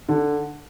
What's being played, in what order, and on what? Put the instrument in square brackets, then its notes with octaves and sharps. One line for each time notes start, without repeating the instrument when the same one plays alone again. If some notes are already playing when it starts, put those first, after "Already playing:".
[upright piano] D3